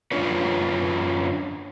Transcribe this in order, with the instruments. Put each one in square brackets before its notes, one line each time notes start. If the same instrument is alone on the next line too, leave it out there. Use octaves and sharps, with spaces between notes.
[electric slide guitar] F#2 D4 F4 B4 C#5